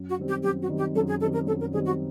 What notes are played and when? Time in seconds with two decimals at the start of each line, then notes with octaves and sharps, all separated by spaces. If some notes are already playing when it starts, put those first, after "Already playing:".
Already playing: F#2
0.09 F#4
0.18 D#3 G3 C4
0.27 G4
0.44 F#2 G4
0.61 F#4
0.69 D#3 G3 C4
0.78 G4
0.95 F#2 A4
1.08 G#4
1.21 D#3 G3 C4 A4
1.33 A#4
1.46 F#2 A4
1.60 A#4
1.73 D#3 G3 C4 G#4
1.85 F#4